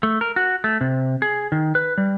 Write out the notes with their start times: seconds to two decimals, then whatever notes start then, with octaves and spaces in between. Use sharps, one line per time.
0.03 A3
0.21 A#4
0.36 F#4
0.64 A3
0.81 C3
1.22 G#4
1.52 D#3
1.75 B4
1.98 G3